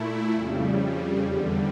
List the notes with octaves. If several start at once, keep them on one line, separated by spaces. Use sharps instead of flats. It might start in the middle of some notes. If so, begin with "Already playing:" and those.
Already playing: A#2 A3 E4
F2 C#3 G3
E2 D3 G3